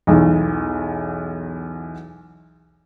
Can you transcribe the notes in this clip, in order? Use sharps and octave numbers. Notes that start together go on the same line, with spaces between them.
B1 E2